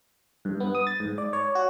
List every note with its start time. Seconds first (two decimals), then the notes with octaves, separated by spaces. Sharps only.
0.45 G2
0.60 B3
0.75 D#6
0.87 A6
1.00 G#2
1.18 D5
1.33 C#5
1.55 F#4